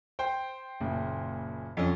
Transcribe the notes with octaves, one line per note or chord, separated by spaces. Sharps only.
C5 G5 C6
F#1 A#2 C#3
F2 F3 C#4